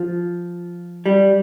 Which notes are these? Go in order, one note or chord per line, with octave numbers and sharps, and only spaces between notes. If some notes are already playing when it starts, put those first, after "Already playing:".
Already playing: F3
G3